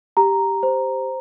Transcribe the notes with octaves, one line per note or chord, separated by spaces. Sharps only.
G4 A#5
C5